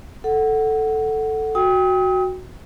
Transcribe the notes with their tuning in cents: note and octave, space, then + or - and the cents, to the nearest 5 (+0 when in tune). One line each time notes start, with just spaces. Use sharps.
A4 +0 F#5 +5
F#4 +0 G5 +15 D#6 +40